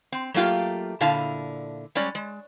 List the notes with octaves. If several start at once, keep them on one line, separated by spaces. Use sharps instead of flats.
C4
F#3 A3 A#3 F4 G4
A#2 D3 E4 F5 A5
G3 G#3 C#4 D5
G#3